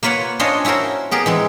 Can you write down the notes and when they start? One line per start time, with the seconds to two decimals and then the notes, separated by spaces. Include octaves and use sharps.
0.03 A#3 F4 B4 C#5 F#5
0.39 C#4 D4 F4 C5 C#5 D#5
0.65 C#4 E4 F#4 A#4 C5
1.11 B3 G4 G#4 A#4
1.26 E3 G#3 C4